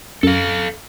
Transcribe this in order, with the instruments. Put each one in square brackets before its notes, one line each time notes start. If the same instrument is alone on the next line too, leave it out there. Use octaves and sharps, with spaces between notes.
[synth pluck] F#2 [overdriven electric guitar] A4 F5